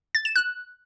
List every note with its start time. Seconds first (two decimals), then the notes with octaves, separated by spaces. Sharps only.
0.15 A6
0.25 E7
0.36 F#6